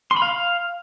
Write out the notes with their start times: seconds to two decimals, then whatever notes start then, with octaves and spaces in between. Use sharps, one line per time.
0.11 C6
0.16 B5
0.22 F5